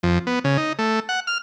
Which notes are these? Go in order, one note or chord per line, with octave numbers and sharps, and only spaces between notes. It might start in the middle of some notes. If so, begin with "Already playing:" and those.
F2
B3
C#3
D#4
A3
F#5
F6